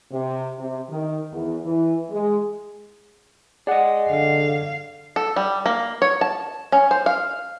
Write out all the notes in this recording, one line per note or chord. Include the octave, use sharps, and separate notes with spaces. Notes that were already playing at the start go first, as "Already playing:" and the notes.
C3
C3
D#3
E2
E3
G#3
G#4 D5 D#5 F#5
D3 F5
A4
G3
A#3
C#5
A5
C#4
C5
F5